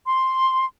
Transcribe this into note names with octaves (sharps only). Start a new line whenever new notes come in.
C6